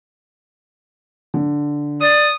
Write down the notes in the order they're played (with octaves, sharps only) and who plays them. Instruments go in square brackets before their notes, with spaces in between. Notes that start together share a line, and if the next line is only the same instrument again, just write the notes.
[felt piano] D3
[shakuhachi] D5 [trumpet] D#6